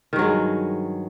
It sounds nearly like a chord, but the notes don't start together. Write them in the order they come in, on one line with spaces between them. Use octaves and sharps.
D#3 G2 F#3 G#3